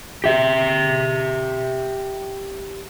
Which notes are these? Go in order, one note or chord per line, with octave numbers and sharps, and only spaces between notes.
G4 E5